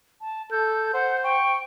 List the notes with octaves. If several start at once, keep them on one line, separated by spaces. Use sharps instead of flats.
A5
A4 G6
C5 F#5
G5 C#6